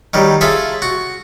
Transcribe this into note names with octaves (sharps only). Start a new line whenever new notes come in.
D#3 F#3 G3
F4 G#4 A4 E5
F#4